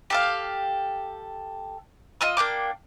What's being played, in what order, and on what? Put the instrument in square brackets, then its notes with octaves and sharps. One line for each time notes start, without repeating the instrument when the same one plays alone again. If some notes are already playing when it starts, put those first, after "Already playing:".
[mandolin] G4 A4 F5
F4 D#5 E6
A#3 D4 G5 D6